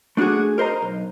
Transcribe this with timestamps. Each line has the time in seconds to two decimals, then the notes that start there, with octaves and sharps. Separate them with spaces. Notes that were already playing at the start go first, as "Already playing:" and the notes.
0.17 A3 D4 F4 F#4 G#4
0.58 A#4 C5 D#5 A#5
0.82 B1